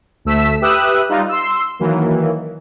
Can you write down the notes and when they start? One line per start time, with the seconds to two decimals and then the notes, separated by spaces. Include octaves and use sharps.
0.25 D2 A3 E6 B6
0.61 G4 B4 E5 D#6 E6 F#6
1.09 G3 D#4 F4
1.29 C6 E6
1.79 D#3 E3 F#3 A#3